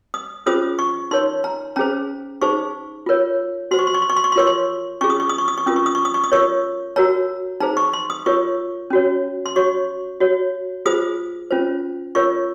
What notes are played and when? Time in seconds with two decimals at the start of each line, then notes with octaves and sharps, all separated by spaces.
0.14 D#6
0.46 C#4 F4 G#4 C5 D#6
0.79 C#6
1.11 D#4 A#4 C#5 C6
1.44 A#5
1.76 C#4 G#4 C5 A#5
2.42 D#4 G#4 C5 C#6
3.06 F4 A#4 C#5
3.71 F#4 C5 C6
3.79 C#6
3.87 C6
3.94 C#6
4.02 C6
4.10 C#6
4.16 C6
4.24 C#6
4.32 C6
4.36 F4 A#4 C#5 C#6
4.47 C6
5.01 C#4 F4 G#4 C#6
5.10 D#6
5.20 C#6
5.29 D#6
5.38 C#6
5.48 D#6
5.58 C#6
5.66 C#4 F4 A#4 D#6
5.76 C#6
5.86 D#6
5.95 C#6
6.05 D#6
6.14 C#6
6.24 D#6
6.32 F4 A#4 C#5 C#6
6.96 F#4 A#4 C#5 A#5
7.60 D#4 G#4 C5 A#5
7.77 C#6
7.93 C6
8.10 D#6
8.26 F4 A#4 C#5 C#6
8.90 C#4 F#4 C#5
9.46 C6
9.56 F#4 C#5 C#6
10.20 F#4 C#5
10.86 F4 G#4 C5 D#6
11.51 C#4 F4 C5
12.15 F4 A#4 C#5 C#6